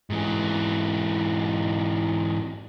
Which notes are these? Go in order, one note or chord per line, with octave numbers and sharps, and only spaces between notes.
G#2 E3